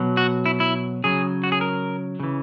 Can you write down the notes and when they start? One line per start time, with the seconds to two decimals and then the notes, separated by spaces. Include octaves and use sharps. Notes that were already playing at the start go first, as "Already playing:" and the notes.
Already playing: B2 F#3
0.17 F#4
0.46 E4
0.60 E4
1.04 C#3 F#3 G#4
1.44 F#4
1.52 G#4
1.61 A#4
2.20 C#3 E3